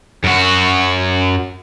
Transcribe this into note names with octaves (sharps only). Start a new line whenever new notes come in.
F#2 F#4